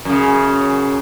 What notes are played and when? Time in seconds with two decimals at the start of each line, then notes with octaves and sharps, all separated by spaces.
0.05 F#2 C#3